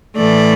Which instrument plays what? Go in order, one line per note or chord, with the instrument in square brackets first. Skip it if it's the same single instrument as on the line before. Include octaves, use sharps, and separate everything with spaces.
[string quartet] A2 E3 A3 D5